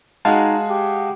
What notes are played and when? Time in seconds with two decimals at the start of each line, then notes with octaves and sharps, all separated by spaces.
0.25 G#3 D#4 F#4 G#4 F5 A5
0.70 G4